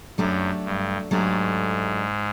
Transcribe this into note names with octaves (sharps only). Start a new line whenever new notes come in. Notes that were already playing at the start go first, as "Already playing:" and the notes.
F#2 F#3 A3 D4 G4
G2
G#2 F#3 A3 D4 G4